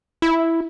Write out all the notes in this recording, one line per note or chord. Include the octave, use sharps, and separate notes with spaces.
E4